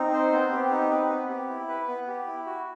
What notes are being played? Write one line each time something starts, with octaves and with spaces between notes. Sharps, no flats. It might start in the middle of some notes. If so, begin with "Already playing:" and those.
Already playing: C4 D#4
C5
B3
G4
D#4
B4
B3
G4
E4
B4
B3
G4
E4
F#4